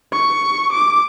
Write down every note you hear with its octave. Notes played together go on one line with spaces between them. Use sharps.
C#6
D6